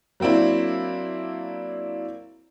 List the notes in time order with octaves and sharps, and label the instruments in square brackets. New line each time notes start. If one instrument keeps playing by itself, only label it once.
[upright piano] F#3 A#3 C4 D4 E4